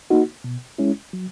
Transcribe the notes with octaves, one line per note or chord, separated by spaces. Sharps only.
A#3 D#4 F#4
B2
G#3 C#4 E4
F#3